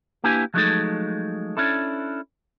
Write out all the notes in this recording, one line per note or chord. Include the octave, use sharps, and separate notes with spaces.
A#3 D4 E4 G4 B4 G#5
F3 F#3 G#3 A3 D#4 A4
C#4 D4 E4 A4